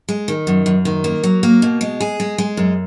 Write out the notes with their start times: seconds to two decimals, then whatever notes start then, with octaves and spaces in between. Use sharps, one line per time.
0.09 G#3
0.28 D#3
0.47 F#2
0.66 F#2
0.85 D#3
1.04 A#3
1.24 F#3
1.43 A#3
1.62 B2
1.81 G#3
2.00 G#4
2.20 G#3
2.38 G#3
2.57 F#2